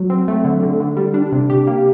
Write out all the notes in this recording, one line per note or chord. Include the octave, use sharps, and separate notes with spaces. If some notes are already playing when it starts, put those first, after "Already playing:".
Already playing: F#3
C4
A3
D3
D3
D3
G3
D4
C3
G4
A#3